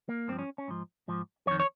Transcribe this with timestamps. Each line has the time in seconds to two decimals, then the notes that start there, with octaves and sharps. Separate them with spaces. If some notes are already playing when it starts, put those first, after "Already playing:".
0.09 A#3
0.28 G2 F3 C4
0.39 C#4
0.58 C#4
0.68 G#2 F3
1.08 G#2 F3
1.47 F2 C#5
1.51 D#3
1.60 C#5